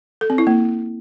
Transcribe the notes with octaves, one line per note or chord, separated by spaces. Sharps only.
A4
C4
E4
A#3